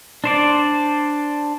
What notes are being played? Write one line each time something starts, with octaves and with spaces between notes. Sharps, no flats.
D4 C5 D5